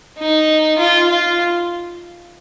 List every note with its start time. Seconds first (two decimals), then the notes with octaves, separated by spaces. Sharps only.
0.19 D#4
0.78 F4
1.09 F4